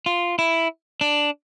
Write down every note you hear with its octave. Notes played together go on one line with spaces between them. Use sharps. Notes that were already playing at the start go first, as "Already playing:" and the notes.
F4
E4
D4